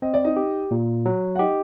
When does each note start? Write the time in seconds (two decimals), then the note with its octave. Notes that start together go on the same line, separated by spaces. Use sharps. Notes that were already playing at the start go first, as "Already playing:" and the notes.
0.02 C4 D#5
0.14 D5
0.24 D#4 D#5
0.36 G4
0.71 A#2
1.06 F#3
1.35 F#5
1.39 D#4 G4 D#5